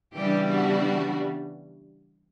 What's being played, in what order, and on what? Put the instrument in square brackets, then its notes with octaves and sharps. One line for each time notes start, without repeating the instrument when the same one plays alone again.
[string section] C#3 E3 G3 B3 D4 G4
F#4